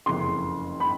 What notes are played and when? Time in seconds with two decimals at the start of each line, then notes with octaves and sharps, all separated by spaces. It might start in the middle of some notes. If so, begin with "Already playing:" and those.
0.06 F#1 F2 C#3 C6
0.80 B5